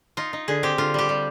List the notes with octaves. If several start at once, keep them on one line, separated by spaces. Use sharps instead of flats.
D#4 F4
D#4
D3 G#4
C4 G4
D3 F4
G3 G4
G3